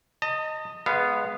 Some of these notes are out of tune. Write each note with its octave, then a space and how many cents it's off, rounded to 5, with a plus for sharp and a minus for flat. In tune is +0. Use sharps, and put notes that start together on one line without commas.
D#5 +0 A5 +40
G#3 +5 B3 +0 F5 -20